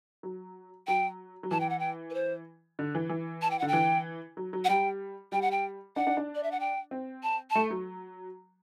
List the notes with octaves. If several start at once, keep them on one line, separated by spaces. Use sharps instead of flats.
F#3
F#3 G5
F#3
E3 A5
G5
F#5
G5
B4
C5
D3
E3
E3
A5
G5
D3 F#5
G5
E3
F#3
F#3
F#5
G3 G5
G3 G5
F#5
G5
D4 F#5
D4
D4
D5
E5
F#5
G5
C4
A5
A3 A5
F#3